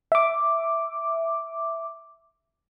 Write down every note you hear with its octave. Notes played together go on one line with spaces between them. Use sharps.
E5 D6